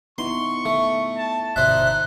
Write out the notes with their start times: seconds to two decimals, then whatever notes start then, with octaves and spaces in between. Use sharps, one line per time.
0.18 B3 D#4 E4 C6 C#6
0.65 A3
1.18 A5
1.56 G1 B2 D#4 C5 D5 E5 F#6